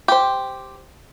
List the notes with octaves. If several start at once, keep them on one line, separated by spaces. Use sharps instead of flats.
G4 C5